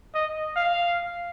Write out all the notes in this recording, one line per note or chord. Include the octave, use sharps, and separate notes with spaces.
D#5
F5